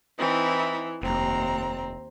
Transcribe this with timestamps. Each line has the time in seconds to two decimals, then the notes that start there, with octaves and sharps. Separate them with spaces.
0.18 E3 C4 D#4 E4
1.02 F1 D#2 C4 A#5